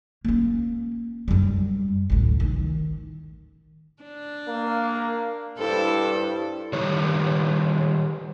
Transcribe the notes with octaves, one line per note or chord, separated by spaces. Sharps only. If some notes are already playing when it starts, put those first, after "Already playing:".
A#3 C#4
F#2 G3
A1 D2
D#3
D4
A#3
G2 E4 A4 C5
D#3 G3 G4 B4 C#5